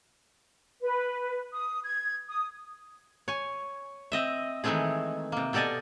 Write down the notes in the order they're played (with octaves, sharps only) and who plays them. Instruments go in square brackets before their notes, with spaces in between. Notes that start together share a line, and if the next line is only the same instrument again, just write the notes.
[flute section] B4
D#6
G#6
D#6
[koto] C#5 G#5
C4 D#5 E5
D#3 E3 G#3 A3 C4 G#4
C3 A#3
B2 G4 A4 D5 D#5 G#5